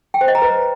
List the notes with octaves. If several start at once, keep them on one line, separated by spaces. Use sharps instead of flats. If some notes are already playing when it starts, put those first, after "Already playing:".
G5
C5
D#5
A#5
B4